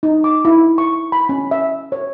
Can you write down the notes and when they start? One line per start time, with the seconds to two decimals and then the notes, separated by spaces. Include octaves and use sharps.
0.03 D#4
0.24 D6
0.45 E4
0.78 C#6
1.12 B5
1.29 C#4
1.51 E5
1.92 C#5